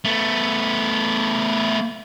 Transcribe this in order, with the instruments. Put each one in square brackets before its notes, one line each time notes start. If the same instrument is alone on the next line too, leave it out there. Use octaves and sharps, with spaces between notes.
[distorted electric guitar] A3 B3